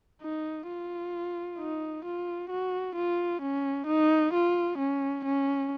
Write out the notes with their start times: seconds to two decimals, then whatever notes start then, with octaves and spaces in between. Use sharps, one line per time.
0.23 D#4
0.68 F4
1.59 D#4
2.05 F4
2.50 F#4
2.96 F4
3.42 C#4
3.87 D#4
4.34 F4
4.79 C#4
5.25 C#4